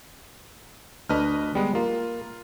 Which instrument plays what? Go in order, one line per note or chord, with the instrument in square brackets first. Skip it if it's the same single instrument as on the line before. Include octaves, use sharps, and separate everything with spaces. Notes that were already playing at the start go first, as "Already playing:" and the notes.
[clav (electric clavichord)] D2 D4 [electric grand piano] B4 D#5 F6
[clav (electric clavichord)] G3 [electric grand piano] G#3 B3
[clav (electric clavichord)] A#3 [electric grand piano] F4